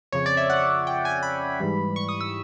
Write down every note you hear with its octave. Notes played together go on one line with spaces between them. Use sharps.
F2 C#3 F3 C#5
D5
E5
F#5
G5
G#5
B5
G#2 E3 G3
C#6
D#6
E6